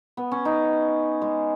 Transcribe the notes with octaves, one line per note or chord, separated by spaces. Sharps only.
B3
C#4
D#4
G#3